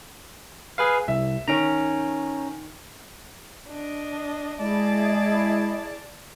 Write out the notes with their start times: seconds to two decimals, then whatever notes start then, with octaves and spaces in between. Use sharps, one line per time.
0.78 G#4 B4 F5
1.08 C2 E5
1.48 D#3 C#4 A#5 D7
3.69 D4 D#5
4.60 G#3 E4 G#4 D5 D#5 A5